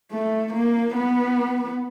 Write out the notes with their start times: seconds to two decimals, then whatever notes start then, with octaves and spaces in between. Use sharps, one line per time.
0.12 A3
0.54 A#3
0.95 B3